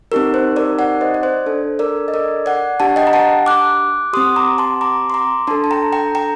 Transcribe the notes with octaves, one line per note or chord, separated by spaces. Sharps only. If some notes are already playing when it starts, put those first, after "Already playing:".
C4 D#4 G4 A#4
C5
A#4 D5
D5 F#5
C5 D#5
D5
C5
D4 A4
A#4 D5
D#5
A#4 D5
D5 F#5
D4 G4 F#5 A5
D#5 G5
A#5
F#5 A5
D6 F#6
C4 G4 C6 D#6
A#5 D6
A5 C6
A#5 D6
C6
A#5 D6
D4 A4 A5 C6
A5
G5 A#5
G5 A#5
G5 A#5